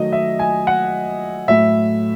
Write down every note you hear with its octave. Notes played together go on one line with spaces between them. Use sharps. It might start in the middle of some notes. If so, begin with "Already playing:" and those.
Already playing: D#3 F#3 A3 D#5
E5
G#5
F#5
A2 F#3 A3 E5